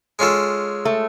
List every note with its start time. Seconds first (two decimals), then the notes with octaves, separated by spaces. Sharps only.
0.19 G#3 C#4 F4 A4
0.85 A3